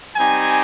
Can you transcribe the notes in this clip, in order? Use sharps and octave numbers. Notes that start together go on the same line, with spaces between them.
G3 C4 D#4 G4 G#5